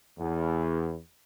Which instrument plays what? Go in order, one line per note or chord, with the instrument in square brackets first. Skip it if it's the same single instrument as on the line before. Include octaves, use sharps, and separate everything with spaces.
[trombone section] E2